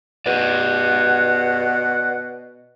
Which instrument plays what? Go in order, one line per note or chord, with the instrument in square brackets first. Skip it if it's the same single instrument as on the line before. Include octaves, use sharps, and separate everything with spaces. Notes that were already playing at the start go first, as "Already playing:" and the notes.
[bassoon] B2 [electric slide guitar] B4 D5 [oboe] F#5